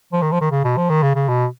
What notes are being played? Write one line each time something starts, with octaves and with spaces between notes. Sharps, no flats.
F3
D#3
F3
D#3
C#3
B2
F3
D#3
C#3
C#3
B2